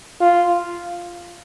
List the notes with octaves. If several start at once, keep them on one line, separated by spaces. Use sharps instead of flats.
F4